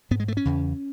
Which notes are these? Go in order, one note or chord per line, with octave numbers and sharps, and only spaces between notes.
G#2 B3
G#3
A3
C#4
E2 C#3